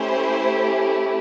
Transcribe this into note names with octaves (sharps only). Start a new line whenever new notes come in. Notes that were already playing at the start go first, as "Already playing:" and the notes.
Already playing: A3 C#4 E4 G4 C5